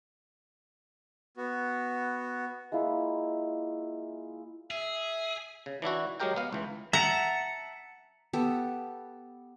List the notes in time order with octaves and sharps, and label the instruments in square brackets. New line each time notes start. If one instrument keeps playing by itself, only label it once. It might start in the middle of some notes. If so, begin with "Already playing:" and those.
[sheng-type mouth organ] B3 F#4
[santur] G#3 A#3 E4 F4
[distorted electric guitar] G#4 [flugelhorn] E5
[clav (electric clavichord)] C#3
E3 D4 E4 F#4
F#3 G#3 G4 A#4 G5
B3 F5
C#2 E3
[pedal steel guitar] E5 F#5 A5 [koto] A#5
[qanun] B3 G4 A4